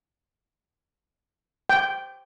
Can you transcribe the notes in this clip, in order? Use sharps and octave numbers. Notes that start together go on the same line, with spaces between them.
G5